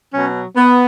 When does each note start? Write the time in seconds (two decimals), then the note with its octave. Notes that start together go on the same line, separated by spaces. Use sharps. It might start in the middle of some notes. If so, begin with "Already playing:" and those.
0.13 B2 F#3 C#4
0.57 B3